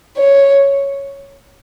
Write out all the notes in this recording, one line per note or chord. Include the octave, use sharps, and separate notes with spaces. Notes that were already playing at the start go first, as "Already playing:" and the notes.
C#5